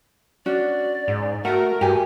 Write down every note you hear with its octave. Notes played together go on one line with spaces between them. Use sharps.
C#4 D4 F#4 D5
G#2
A3 F#4 A#4 F#5
G2 G4 G#5